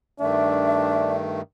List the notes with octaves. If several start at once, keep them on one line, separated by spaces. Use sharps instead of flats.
G2 D#3 A3 D4 E5